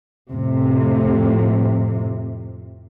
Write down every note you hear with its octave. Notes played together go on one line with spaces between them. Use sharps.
F2 A2 C3